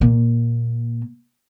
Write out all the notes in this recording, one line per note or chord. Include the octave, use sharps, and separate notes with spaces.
A#2 A#3